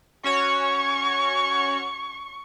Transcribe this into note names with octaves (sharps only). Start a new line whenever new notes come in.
C#4 F#4 C#5 C#6